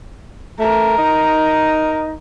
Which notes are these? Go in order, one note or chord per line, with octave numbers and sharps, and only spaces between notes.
A3 A#4
D#4